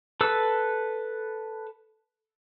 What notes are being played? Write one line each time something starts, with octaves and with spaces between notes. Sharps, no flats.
A4 B4 E6